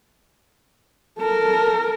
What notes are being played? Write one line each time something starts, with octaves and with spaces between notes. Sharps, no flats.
A4 A#4